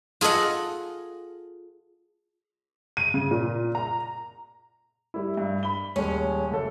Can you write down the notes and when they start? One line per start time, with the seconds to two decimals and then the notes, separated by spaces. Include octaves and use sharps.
0.21 F4 G#4 A4 D#5 F#5
2.97 D#7
3.14 C#3
3.31 A#2
3.75 A#5
5.14 G3 E4
5.37 G2
5.63 B5 G7
5.96 D#1 G#3 C#4
6.51 F#1 A4